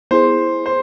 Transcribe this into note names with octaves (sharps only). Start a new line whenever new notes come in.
B3 E4 G#4 C5
C5